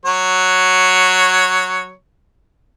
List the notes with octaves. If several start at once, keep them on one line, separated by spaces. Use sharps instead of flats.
F#3 C#5